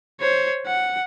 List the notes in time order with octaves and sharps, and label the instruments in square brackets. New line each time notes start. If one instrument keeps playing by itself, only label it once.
[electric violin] C5 C#5
F#5